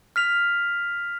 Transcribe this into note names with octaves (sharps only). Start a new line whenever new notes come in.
F6 B6 F7